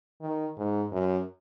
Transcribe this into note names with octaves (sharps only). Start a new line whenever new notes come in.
D#3
G#2
F#2